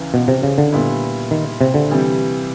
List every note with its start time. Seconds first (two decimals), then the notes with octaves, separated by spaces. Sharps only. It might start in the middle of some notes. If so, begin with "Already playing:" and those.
Already playing: C#2 C#3 E3
0.14 B2
0.28 C3
0.43 C#3
0.58 D3
0.72 A#2 G3 B3 E4
1.31 D#3
1.61 C3
1.74 D3
1.90 C3 E3 G3